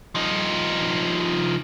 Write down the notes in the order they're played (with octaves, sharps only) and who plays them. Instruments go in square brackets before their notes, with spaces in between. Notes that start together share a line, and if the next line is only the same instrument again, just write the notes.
[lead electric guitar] F3 D#4